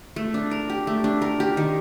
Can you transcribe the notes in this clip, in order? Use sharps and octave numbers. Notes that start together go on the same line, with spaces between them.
A3
D4
A#4
G4
A3
D4
A#4
G4
D#3